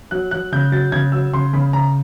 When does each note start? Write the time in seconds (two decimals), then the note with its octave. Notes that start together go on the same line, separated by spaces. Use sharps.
0.11 F#3 F#6
0.31 F#3 F#6
0.52 C#3 G6
0.72 F#3 A6
0.92 C#3 G#6
1.12 F#3 E6
1.33 C#3 C6
1.53 C#3 B5
1.73 C#3 A#5